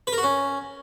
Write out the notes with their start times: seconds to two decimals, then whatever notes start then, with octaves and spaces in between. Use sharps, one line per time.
0.07 B4
0.13 A#4
0.18 F#4
0.23 C#4